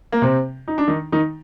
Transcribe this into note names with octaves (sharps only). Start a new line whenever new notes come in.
A#3
C3 C4
D#4
D4
D#3 D#4
D#3 D#4